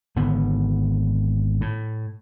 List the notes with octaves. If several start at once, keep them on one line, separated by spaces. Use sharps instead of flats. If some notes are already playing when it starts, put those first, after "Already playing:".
G#1 D3 B3
A2